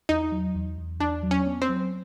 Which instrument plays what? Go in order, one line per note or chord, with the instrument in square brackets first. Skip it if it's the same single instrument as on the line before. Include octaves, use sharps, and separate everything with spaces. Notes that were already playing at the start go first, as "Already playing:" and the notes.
[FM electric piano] E2 [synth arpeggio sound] D#4
[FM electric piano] F#3
E2
E2
[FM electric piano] E2 [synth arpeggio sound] D4
[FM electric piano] F#3
[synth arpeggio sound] C#4
[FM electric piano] B3
[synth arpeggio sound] C4
[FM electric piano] F#3